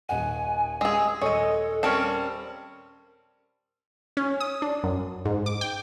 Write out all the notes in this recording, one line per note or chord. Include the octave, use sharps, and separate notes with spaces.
D#1 D#5 F#5 G#5
G#3 G#4 E6
D#1 G#3 A4 C#5 D#5
G3 C4 C#4 A#4 A5
C#4
D#6
D4
F#2
G#2
D6
G5